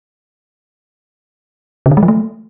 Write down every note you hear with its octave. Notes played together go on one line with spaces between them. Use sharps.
C#3
D3
G#3
F3
A3